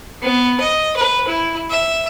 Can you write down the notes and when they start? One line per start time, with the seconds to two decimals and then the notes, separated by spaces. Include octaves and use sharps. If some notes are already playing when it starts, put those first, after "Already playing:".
0.22 B3
0.60 D#5
0.96 B4
1.28 E4
1.70 E5